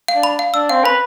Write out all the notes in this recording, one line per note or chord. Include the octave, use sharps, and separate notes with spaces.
F5
D4
B5
F5
D4 E6
C4 F5
B4 B5